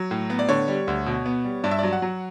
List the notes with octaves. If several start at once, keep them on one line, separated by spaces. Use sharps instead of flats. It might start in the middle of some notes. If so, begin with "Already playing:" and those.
Already playing: F#3
A2
B3
D5
D3 C#5
G3
D2
B2
B3
G3
G2 D5
E5
F#3 D5
F#5
F#3